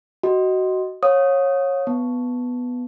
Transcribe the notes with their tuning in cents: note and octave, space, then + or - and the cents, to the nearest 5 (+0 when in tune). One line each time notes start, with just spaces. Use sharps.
F#4 +15 D#5 +5
C#5 -20 F5 +40 D#6 +0
B3 +0 A5 +0